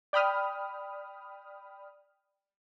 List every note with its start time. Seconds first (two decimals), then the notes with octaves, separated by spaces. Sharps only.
0.13 D5 G5 B5 D#6 F6